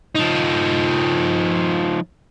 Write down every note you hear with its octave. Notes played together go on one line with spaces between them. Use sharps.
F3 D#4